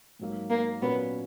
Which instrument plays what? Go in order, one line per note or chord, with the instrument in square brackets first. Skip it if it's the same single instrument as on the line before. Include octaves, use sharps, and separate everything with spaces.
[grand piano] G#2 F#3 A#3
[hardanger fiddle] A#3
[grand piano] A#2 F#3 C#4 F#4 [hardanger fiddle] B3